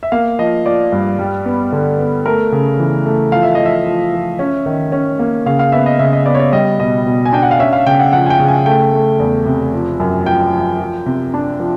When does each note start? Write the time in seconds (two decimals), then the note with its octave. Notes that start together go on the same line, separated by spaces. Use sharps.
0.03 E5
0.12 A#3 F5
0.39 F3 D#5
0.66 F3 D5
0.92 G2
1.19 G3
1.45 B3
1.72 D3
1.98 B3
2.26 A3 A#4
2.52 C#3
2.79 E3
3.06 A3
3.32 F3 F5
3.43 E5
3.55 F3 D#5
3.66 E5
3.85 F3
4.12 F3
4.39 C#4
4.66 D#3
4.92 C#4
5.19 A#3
5.46 C#3 F5
5.59 F5
5.72 B3 E5
5.86 D#5
5.99 C#3 E5
6.13 D#5
6.26 B3 D5
6.35 C#5
6.39 D5
6.52 G3 D#5
6.79 B2 D#5
7.06 B2
7.25 G#5
7.33 D4 G5
7.43 F#5
7.51 F5
7.59 C#4 E5
7.73 F5
7.86 C#3 G5
7.99 F#5
8.13 F3 F#5
8.26 G#5
8.30 G5
8.39 C#3
8.48 G#5
8.66 A3 G5
8.93 A3
9.19 E2
9.46 C3
9.73 F3
10.00 F#2
10.26 F3 G5
10.53 F3
10.79 F3
11.06 C3
11.34 D4
11.60 F3